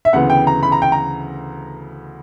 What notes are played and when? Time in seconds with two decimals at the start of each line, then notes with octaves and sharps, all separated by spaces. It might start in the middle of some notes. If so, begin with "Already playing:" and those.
0.05 E5
0.13 D2 C#3 E3 B3 F#5
0.30 G5
0.47 A#5
0.63 B5
0.72 A#5
0.82 G5
0.92 A#5